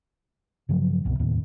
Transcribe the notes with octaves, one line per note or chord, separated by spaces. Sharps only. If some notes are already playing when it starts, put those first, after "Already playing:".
G2 C#3 F3 F#3
F#1 C2 B2
E1 D#2 A2 D#3